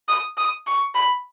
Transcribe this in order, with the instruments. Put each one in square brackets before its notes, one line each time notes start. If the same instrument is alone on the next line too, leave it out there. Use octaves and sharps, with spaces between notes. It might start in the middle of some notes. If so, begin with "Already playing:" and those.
[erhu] D#6
D#6
C#6
B5